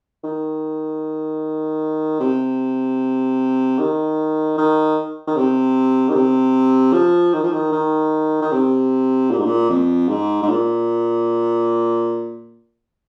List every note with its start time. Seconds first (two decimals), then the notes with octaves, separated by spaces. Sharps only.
0.24 D#3
2.20 C3
3.78 D#3
4.57 D#3
5.27 D#3
5.36 C3
6.09 D#3
6.15 C3
6.93 F3
7.33 D#3
7.43 F3
7.53 D#3
7.72 D#3
8.41 D#3
8.51 C3
9.31 A#2
9.38 G#2
9.46 A#2
9.69 F2
10.09 G#2
10.42 G#2
10.49 A#2